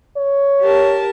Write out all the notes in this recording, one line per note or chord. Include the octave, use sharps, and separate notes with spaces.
C#5
G4 A#4 A5